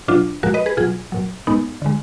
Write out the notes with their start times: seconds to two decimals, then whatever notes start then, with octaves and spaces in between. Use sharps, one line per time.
0.08 B2 F#3 D4 F4
0.43 A#2 F3 G#3 F#4 A#4
0.54 B4 D#5
0.66 G#4 B4
0.77 B2 F#3 F4 G#4
1.12 A#2 F#3
1.47 A#2 G#3 B3 D#4
1.82 D3 G#3